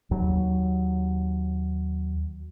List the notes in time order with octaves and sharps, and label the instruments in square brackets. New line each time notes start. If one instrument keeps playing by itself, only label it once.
[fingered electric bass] D#2 F#3